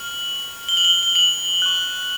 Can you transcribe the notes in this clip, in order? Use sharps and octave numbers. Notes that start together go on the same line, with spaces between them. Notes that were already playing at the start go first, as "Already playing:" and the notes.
Already playing: C#6 F6 F#7
G7
F#7
G7
G7
F#7
C#6 F#6